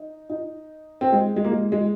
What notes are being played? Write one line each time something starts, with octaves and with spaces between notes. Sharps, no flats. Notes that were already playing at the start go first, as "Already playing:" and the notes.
Already playing: D#4
D#4
C4
G#3
G#3
A#3
G#3
G#3